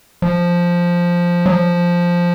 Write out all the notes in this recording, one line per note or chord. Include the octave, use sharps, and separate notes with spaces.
F3
F#3
F3